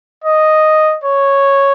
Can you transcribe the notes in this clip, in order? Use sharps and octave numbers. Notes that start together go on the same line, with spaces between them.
D#5
C#5